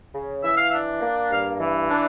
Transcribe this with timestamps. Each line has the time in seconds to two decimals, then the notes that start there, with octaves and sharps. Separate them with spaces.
0.13 C#3
0.43 E3 E5
0.57 F5
0.70 E5
0.73 D4
1.01 A#3
1.30 G2 F5
1.60 E3
1.89 D4